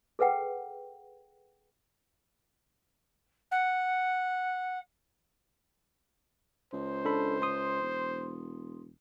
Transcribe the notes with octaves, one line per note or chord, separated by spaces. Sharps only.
G#4 A4 B4 F#5 G5
F#5
C#2 C5
D4 A4 B5
C6 D#6
E1